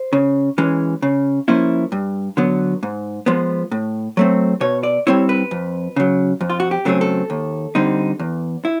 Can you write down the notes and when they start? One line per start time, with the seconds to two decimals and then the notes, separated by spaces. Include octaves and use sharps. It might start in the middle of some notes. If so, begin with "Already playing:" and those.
Already playing: C5
0.13 C#3
0.58 E3 G#3 C#4
1.02 C#3
1.48 F3 A#3 C#4 E4
1.92 G2
2.37 D3 F#3 B3
2.83 G#2
3.26 F3 G#3 B3
3.71 A2
4.17 F#3 A3 C4
4.61 B2 C#5
4.83 D5
5.07 G3 C4 E4 C#5
5.29 B4
5.51 F2
5.96 C#3 F#3
6.41 F2
6.50 F4
6.60 F#4
6.71 G4
6.85 C#3 F#3 A3 C4 G#4
7.01 A4
7.30 D#2
7.75 D3 G3 C4 D#4
8.19 E2
8.65 E4